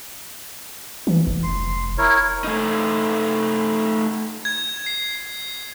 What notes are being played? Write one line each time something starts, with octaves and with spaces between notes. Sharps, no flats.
E3
F1
C6
E4 A#4 C#5
A3 D#4
G#6
C7